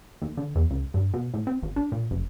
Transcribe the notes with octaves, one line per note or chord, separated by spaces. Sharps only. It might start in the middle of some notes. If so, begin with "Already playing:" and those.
D#2
D3
E2
C#2
G2
B2
A2
C4
G#1
D4
A#2
F#1